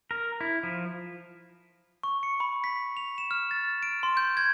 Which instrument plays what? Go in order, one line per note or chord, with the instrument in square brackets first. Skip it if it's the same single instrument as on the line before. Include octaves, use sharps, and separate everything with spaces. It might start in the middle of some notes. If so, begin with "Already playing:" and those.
[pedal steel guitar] A#4
E4
F3
[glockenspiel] C#6
C#7
B5
B6
F7
E7
F6
A6
D7
C6
G6
G#6